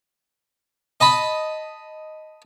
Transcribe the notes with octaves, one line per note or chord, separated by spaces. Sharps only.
D#5 A5 B5